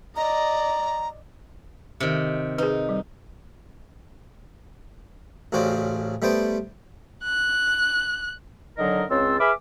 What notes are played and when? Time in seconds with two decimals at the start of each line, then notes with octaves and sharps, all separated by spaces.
0.16 D5 D#5 A#5
2.00 C3 D#3
2.58 D#4 G#4 B4
2.89 G3
5.52 A1 A2 C#3 F#4 C5 D5
6.22 G3 A3 B3 C5 G5 A5
7.24 F#6
8.77 D3 D#3 F#3 A#4 D#5
9.10 C#2 C#3 C4 A5 C6 E6
9.40 G#4 B4 E5 B5 D6 F6